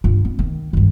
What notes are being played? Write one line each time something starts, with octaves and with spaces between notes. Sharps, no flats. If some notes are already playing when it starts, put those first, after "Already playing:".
G2 F4
B3
D#3 A#3
G2 D#3